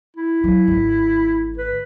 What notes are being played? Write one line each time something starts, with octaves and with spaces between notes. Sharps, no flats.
E4
F#3
G#1 D3
B4